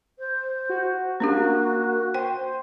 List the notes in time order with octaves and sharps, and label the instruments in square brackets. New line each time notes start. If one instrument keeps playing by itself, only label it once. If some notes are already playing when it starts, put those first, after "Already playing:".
[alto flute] C5
[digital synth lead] F#4
[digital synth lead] A#3 [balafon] C#4 D4 G4 [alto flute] F#4
[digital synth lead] C5 [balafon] G5